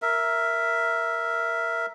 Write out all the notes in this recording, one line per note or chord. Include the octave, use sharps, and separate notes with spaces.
A#4 E5